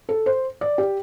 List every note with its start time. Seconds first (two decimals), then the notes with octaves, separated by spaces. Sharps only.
0.09 A4
0.26 C5
0.61 D5
0.78 G4